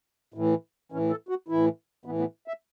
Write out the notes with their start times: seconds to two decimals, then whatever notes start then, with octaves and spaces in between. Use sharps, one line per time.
0.34 A2 E3
0.92 A2 E3 C#4
1.10 A4
1.29 F#4
1.48 A2 E3 E4
2.05 A2 E3 B3
2.19 B3
2.48 E5